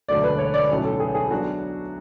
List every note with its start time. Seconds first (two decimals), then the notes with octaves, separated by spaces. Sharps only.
0.08 E1 D2 D3 F#3 A3 D5
0.23 B4
0.38 C#5
0.54 D5
0.69 B1 A2 F#3 C#4
0.85 A4
1.00 G#4
1.15 G#4
1.30 F#3 B3 D4 F#4